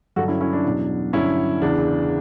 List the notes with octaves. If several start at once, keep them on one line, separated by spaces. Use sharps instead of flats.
G2 D3 F#3 F#4 A4
C#4 E4
C#4 E4
D4
E2 B2 F#3
G2 D3 F#3 C#4 E4
E2 C#3 E3 D4